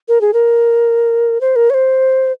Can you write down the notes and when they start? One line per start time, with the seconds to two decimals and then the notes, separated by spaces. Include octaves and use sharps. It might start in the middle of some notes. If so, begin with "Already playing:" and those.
0.08 A#4
0.21 G#4
0.33 A#4
1.41 C5
1.56 A#4
1.70 C#5
1.74 C5